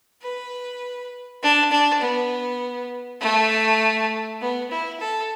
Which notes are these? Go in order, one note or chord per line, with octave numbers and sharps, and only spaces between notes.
B4
D4
D4
B3
A3
B3
E4
A4